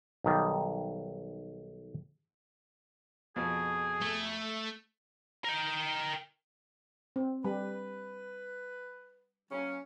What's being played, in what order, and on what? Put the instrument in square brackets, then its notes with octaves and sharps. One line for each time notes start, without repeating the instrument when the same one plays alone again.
[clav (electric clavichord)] B1 D#3 G3
[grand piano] F2 B2 F3 [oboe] G#4
[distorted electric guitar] A3
A#4 G5
[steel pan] C4
[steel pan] G3 [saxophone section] B4
[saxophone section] F#3 A#3 C#4